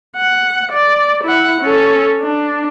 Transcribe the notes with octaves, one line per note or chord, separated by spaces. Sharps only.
F#5
D5
E4 F#5
C#4 A4
D4